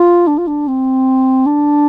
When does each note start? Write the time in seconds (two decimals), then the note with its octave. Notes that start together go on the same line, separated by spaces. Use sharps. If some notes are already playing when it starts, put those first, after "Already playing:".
Already playing: F4
0.27 D4
0.38 F4
0.47 D4
0.68 C4
1.46 D4